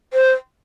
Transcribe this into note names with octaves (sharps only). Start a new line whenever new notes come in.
C5